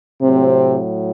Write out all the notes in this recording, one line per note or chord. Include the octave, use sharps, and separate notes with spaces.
A2 C3 F#3 C4